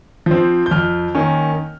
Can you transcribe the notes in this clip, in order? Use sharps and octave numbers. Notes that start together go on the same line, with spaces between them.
F3 C4
G6
F2 F6
D#3 A#3 C#4